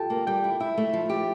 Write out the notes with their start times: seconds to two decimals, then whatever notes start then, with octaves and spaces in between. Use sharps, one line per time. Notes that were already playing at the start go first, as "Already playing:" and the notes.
Already playing: F4 G4 A4 G5 A5
0.10 A#3
0.27 G3 G5
0.44 E4
0.60 E4 E5
0.77 A3
0.93 F3
1.09 G4